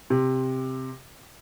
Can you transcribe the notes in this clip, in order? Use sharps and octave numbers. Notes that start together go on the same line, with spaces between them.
C3